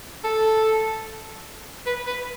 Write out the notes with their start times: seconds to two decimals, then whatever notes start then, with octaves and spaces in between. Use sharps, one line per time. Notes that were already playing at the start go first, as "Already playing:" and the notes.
0.24 A4
1.87 B4
2.07 B4